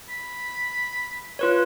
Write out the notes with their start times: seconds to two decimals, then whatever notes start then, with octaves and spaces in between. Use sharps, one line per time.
0.09 B5
1.39 F4 B4 C#5